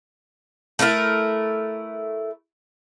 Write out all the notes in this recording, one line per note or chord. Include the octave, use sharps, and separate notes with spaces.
A3 E4 F4 A#4